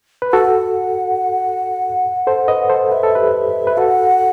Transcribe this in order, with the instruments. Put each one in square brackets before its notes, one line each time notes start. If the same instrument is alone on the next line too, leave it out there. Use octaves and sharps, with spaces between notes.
[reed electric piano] B4
[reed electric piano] F#4 A4 [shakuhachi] F#5
[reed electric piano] A4 C5
B4 D#5
A4 C5
[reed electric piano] B4 [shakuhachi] E5
[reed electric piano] A4
G4 B4
B4
[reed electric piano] F#4 A4 [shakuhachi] F#5